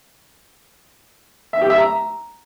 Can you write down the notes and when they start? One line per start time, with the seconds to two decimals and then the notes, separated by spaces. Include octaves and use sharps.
1.53 E5
1.62 G4
1.70 E5
1.78 A#5